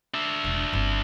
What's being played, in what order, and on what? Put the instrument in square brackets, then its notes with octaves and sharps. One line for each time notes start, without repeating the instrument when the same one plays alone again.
[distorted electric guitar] D4 E5
[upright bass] E1
G1 C4